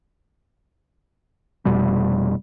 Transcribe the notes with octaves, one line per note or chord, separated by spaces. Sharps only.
F1 B2 G3